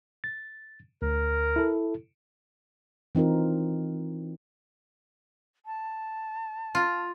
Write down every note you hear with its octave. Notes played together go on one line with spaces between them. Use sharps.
A6
D2 A#4
E4 A4
E3 C4 D#4 F4 A#4
A5
F4